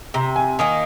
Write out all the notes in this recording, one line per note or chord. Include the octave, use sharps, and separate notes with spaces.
C3 A#5
G#5
D#3 A#3 D#4 G#5